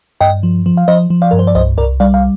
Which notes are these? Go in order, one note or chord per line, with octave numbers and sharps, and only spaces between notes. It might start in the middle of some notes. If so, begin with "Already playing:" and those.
G2 D#5 G5
F3
F3
F5
F3 C5 D#5
F3
D5 F5
G2 A#4
C5
D5
C2 C5 D#5
C2 A#4 D5
G3 D5 F5
F5